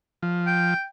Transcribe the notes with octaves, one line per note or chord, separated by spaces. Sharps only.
F3
G5